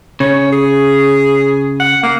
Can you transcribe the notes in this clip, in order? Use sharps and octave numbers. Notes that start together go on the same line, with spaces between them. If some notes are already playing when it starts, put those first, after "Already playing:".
C#3 C#5
G#4
F#5
A#3